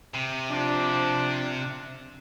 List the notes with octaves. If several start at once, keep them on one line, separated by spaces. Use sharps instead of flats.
C3
F3 D4